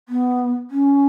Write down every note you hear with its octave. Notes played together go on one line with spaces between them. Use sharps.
B3
C#4